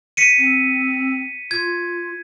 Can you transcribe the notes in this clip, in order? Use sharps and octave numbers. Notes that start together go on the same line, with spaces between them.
B6 C#7 D#7
C4
F4 G#6